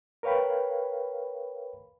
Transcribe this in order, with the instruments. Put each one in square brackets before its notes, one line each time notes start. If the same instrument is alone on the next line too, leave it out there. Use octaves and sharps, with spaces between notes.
[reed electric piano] A#4 B4 C#5 F5 G5 B5